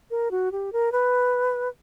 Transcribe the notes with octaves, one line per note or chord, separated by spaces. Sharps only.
A#4
F#4
G4
A#4
B4